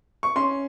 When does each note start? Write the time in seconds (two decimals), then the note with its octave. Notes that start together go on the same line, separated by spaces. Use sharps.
0.23 C#6
0.36 C#4 C6